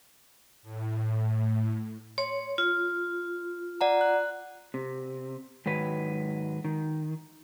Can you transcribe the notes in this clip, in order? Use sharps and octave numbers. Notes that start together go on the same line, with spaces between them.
A2
C#5 C6
F4
D5 F#5 A#5
F#6
C3
G#2 D#3 F#3 B4
D#3